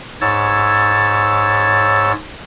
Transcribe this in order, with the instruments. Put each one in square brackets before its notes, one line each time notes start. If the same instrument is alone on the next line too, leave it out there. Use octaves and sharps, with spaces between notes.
[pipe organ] G#2 C#5 E6 A6